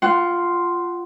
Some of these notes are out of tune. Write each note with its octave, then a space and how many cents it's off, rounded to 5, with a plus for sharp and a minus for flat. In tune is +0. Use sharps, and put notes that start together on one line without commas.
F4 +0 F#5 +25 C6 +0